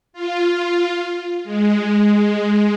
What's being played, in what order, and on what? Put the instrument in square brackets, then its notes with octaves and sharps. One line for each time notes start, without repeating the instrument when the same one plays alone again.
[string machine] F4
G#3